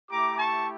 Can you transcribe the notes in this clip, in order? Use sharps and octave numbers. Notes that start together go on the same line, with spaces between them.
A3 E4 G4 A#5 D6
A5 C#6